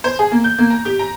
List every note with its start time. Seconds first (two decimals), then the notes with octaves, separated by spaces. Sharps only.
0.04 C5
0.19 G#4
0.32 A#3
0.44 G6
0.59 A#3
0.70 A#5
0.85 G4
0.99 A#5